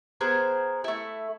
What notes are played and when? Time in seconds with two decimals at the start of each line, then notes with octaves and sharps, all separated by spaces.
0.21 B3 G#4 A#4 C5
0.84 A3 E4